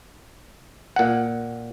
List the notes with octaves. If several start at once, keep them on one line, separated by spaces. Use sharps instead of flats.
A#2 F#5